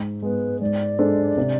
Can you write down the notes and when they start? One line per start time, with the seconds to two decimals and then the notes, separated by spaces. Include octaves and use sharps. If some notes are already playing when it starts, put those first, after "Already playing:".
Already playing: G#2
0.22 G#3 B3 B4
0.61 G#2 D5
0.99 G#3 D4 A4 C5
1.38 C3